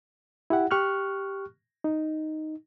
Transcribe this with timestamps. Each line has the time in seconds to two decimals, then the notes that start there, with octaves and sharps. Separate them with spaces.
0.50 E4 G4 F#5
0.71 G4 C#6 F6 F#6
1.84 D#4